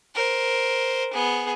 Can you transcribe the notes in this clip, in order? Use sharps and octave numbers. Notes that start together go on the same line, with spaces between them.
A#4 C5
B3 G#4